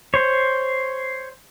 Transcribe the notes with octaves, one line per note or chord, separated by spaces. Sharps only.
C5 C#5